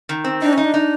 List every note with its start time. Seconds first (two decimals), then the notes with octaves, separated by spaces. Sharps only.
0.09 D#3
0.24 C4
0.42 D4 D#4
0.53 C#4 D#4
0.64 D4
0.74 D#4